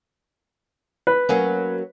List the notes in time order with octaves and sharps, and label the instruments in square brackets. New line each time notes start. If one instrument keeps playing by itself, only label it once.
[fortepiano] B4
[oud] F#3 A#3 C#4